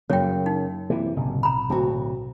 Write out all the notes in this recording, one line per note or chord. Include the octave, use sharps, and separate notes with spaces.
F#2 C#3 A#3 C#5 G5
D#4
C3 E3 A#3
F#1 B1 A2 C3
A#5 B5
D1 C4 F#4